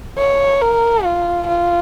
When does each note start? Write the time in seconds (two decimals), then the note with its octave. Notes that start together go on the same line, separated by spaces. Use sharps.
0.18 C#5
0.61 A#4
1.04 F4
1.47 F4